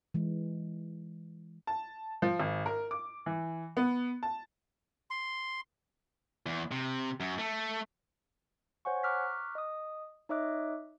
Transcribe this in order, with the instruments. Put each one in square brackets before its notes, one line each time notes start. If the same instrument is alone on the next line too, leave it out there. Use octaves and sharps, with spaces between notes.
[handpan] E3 G#3
[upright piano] A5
F3
G#1
A#4
D6
E3
B3
A5
[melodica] C6
[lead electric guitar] E2
C3
F#2
A3
[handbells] C5 C#5 F#5 G#5 C#6
A#5 C#6 D6 F6 F#6 B6
D#5 D#6
D#4 C#5 D#5 E5 D6 F#6